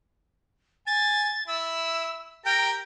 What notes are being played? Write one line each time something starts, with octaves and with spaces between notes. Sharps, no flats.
G#5 A6
E4 E6
G4 A#4 G5